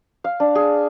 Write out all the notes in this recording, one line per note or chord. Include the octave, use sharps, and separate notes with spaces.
F5
D4
G#4